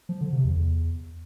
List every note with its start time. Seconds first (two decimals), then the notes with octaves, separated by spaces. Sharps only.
0.09 F3
0.21 D3
0.33 C3
0.45 E2
0.57 E2